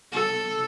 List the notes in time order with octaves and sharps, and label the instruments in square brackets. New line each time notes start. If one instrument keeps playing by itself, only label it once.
[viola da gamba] A4